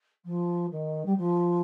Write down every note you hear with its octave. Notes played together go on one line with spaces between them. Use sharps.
F3
D#3
G3
F3